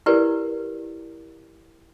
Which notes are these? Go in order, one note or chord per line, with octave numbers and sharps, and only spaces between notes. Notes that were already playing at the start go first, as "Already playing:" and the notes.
E4 G4 A#4 B4 D5